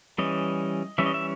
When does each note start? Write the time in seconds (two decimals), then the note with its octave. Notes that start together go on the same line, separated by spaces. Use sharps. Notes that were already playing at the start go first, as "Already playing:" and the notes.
0.18 E3 G3 C#4 D#5
0.98 E3 G3 C#4 E5
1.06 D#5
1.14 E5